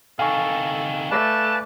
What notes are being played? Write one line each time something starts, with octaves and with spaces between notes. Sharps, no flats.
C3 D#4 A4 F5 G#5 C#6
A3 B4 D5 A5